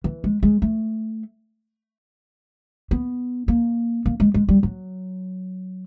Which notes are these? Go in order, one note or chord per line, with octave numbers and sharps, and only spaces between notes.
E3
G#3
G#3
A3
B3
A#3
A#3
G#3
G#3
G3
F#3